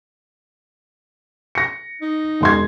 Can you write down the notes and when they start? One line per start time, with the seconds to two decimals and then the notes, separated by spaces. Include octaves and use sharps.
1.55 A#6 C#7
2.02 D#4
2.41 E1 C6 G#6